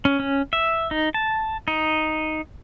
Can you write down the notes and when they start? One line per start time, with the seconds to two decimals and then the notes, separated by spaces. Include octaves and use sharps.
0.05 C#4
0.20 C#4
0.53 E5
0.91 D#4
1.14 A5
1.68 D#4